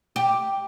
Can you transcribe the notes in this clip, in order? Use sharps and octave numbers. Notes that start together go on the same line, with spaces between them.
G4